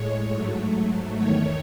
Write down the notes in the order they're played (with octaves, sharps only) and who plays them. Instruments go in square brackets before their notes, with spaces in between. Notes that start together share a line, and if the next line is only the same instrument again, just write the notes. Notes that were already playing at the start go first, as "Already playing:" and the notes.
Already playing: [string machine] A2 G#3 C#5
G#2 F#3 A3
E2 D#3 A3 C#5